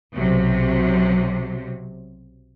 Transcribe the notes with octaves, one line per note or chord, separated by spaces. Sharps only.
B1 C3 F#3